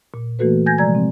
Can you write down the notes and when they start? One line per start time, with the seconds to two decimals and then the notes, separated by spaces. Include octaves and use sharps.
0.14 A#2
0.39 E3 A3 A#3 F#4 A4 B4
0.66 G#5 G6 G#6 A#6
0.78 C3 F3 G#3 D5 A#5 G#6
0.95 C4